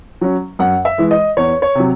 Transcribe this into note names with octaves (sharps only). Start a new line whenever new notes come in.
F#3 C#4
F#2 F#5
E5
E3 G#3
D#5
E2 C#5
C#5
C3 F#3